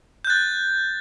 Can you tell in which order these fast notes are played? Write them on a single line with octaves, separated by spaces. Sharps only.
G6 F#6 A6